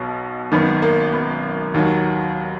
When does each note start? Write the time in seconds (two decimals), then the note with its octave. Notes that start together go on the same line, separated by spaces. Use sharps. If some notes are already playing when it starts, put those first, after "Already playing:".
Already playing: B1 B2 F#3
0.52 G#1 F#2 D#3 B3
0.82 A#3
1.13 B3
1.74 D#2 D#3 F#3